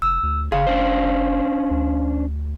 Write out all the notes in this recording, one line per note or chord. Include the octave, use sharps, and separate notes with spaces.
F1 E6
D2
F#1 C#3 G#4 F5 C6
C#4 D4 C5
D2